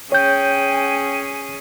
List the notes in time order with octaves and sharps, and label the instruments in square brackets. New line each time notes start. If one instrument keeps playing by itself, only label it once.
[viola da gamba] C#4 G#4 [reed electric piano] C#5 G6 [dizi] G5